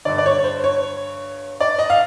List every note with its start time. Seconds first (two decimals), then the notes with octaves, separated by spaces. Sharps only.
0.05 G2 D3 D5
0.18 D5
0.26 C#5
0.44 C5
0.64 C#5
1.60 D5
1.79 D#5
1.90 F5